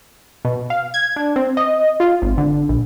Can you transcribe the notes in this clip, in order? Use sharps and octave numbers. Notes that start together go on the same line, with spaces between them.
B2
F5
G#6
D4
C4
D#5
F4
G#1
D3
A#1